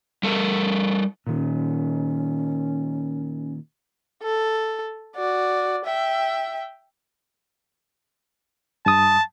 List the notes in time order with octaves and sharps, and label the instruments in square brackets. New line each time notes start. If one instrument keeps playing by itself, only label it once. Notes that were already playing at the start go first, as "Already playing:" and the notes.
[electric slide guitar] G3 A4 A#4
[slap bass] A#2 D#3 [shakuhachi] C#4
[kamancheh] A4
F#4 D5
E5 G5
[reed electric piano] G2 D#6 [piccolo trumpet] A5